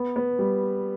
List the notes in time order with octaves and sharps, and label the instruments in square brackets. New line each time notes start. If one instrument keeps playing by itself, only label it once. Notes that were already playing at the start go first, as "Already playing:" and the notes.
Already playing: [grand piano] B3
B3
G3